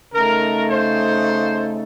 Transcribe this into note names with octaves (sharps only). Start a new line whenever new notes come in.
C#3 A3 D#4 A#4
C5